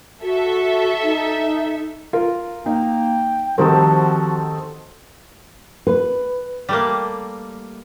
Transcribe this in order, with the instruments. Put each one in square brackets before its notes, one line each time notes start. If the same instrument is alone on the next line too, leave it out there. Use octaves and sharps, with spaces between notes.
[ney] F#4 [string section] A4 E5
[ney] D#4
[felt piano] F4 A#4
[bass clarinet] A#3 [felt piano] D#4 [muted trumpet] G5
[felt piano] D#3 G3 A#4 [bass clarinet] F3 [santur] C4 D#4 A4 [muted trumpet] F#4
[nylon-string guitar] B4
[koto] G3 A3 A#3